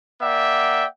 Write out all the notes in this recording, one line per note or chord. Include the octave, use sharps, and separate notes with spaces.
A#3 D5 E5 F#5 G5